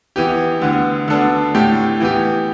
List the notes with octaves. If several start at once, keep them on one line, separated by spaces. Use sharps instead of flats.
E3 B3 G4
D2 D3 B3
D2 D3 B3 D4 A4
A2 A3 G4
E3 B3 G4